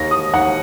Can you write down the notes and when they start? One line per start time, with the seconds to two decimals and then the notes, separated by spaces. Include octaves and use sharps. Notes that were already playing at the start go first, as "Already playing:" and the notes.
Already playing: D#2 A#6
0.11 D#6
0.33 D#2 F#5